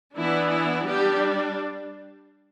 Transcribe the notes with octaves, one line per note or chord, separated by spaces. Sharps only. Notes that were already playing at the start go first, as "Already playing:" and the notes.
E3 B3 D4 E4
E4
G3 D4 G4